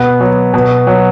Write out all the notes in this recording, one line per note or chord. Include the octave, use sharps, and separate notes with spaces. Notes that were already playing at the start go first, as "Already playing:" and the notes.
Already playing: B2 B3
F#3
B2
F#3